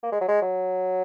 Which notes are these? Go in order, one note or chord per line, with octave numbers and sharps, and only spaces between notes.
A#3
G#3
F#3
G#3
F#3